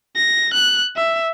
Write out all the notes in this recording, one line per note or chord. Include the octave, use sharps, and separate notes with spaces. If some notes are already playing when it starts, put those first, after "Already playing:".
A#6
F#6
E5